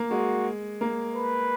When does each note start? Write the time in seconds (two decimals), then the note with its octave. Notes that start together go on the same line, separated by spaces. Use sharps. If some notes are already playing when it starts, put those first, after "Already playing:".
Already playing: A#3
0.11 G#3 F#4
0.81 A#3
1.15 B4